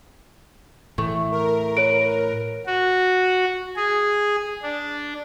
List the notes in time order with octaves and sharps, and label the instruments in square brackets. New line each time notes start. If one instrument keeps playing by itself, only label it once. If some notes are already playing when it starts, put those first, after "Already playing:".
[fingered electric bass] A2 E3 [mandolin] A3
[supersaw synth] A#4
[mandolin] B4 [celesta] C#5 D7
[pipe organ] F#4
G#4
D4